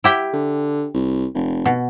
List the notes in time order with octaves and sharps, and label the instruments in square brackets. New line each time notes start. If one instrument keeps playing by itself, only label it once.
[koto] E4 G4 G5
[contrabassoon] D3
C2
F1
[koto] B2